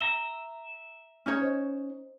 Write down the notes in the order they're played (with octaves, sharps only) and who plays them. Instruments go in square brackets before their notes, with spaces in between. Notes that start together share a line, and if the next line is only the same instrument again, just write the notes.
[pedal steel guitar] E5 A#5 [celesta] G7
[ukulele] C#4 D#4 C#5 [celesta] F6
[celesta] C5 D#5